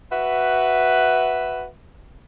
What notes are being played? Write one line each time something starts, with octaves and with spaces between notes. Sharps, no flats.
F#4 B4 E5